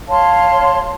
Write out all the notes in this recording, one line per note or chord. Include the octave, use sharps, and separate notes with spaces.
C#5 F5 A5 C6